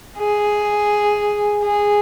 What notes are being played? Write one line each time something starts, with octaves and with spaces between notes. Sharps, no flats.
G#4
G#4